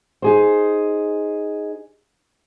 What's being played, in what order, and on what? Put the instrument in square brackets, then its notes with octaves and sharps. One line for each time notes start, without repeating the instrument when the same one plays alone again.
[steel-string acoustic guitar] D#4 G#4 C5